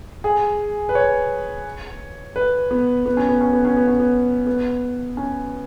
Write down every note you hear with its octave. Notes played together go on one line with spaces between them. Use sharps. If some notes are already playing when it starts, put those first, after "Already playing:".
G#4
B4
C#5
B4
B3
B3
C#4
B3
C#4
B3
C#4
B3
C#4
B3
B3
C#4